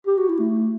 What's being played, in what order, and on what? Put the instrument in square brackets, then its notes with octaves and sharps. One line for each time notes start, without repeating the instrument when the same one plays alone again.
[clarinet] G4
F#4
E4
A3